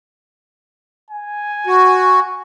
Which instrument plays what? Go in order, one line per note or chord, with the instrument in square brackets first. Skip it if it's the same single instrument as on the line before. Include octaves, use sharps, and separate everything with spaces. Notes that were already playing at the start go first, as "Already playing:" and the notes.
[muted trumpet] G#5
[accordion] F#4